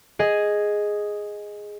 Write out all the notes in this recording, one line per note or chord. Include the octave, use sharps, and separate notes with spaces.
G#4 D#5